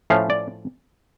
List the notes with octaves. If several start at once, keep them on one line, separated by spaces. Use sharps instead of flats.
A2 F3 A3 C#4 F5
D5